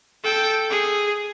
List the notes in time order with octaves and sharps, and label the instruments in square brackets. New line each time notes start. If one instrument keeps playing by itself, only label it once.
[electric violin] A4 G5
G#4